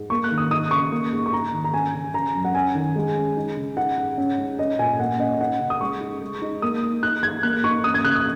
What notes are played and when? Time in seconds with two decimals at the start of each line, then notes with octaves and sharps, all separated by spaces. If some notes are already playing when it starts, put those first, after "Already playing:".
Already playing: G#2
0.10 A#3 C#6
0.24 F#6
0.31 D#3
0.38 D#6
0.51 D#4 D#6
0.71 C#3 C#6
0.92 A#3
1.12 G#2
1.26 C#6
1.32 D#4 A#5
1.53 D#3
1.64 A#5
1.74 C#4 G#5
1.94 C#3
2.14 C#4 A#5
2.34 F#2
2.45 F#5
2.55 C#4 G#5
2.75 D#3
2.96 G#3
3.16 C#4
3.37 D#4
3.57 C#3
3.77 D#4 F#5
3.97 G#2
4.18 C#4
4.38 G#2
4.59 C#4 D#5
4.79 A#2 G#5
5.00 A#3 F#5
5.19 C#4 D#5
5.40 D#4 F#5
5.60 C#3
5.70 D#6
5.81 G#3 C#6
6.01 D#4
6.21 G#3
6.42 D#4
6.62 A#3 D#6
6.83 D#4
7.03 D#4 F#6
7.23 G#2 G#6
7.43 A#3 F#6
7.64 D#4 C#6
7.84 C#4 D#6
7.94 G#6
8.04 C#3 F#6
8.16 D#6